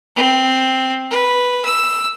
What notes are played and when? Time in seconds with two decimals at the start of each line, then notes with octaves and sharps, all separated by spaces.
0.16 C4
1.10 B4
1.65 E6